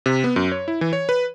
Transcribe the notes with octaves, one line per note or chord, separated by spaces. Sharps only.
C3
B3
F#2
C#5
E4
E3
C#5
B4